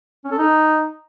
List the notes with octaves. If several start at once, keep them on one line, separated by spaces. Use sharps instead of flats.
C#4
A4
D#4